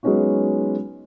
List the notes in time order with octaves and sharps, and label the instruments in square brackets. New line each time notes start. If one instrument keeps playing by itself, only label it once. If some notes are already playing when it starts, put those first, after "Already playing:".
[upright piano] F#3 G#3 B3 C#4 D#4 F#4